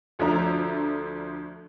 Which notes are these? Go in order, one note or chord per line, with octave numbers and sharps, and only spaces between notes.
D2 F3 A3 D4 E5 A#5